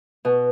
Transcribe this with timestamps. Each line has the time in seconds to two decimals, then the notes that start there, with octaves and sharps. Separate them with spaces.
0.25 B2